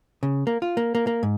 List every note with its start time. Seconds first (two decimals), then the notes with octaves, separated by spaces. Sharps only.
0.23 C#3
0.47 A#3
0.62 F4
0.77 A#3
0.95 A#3
1.07 A#3
1.23 G#2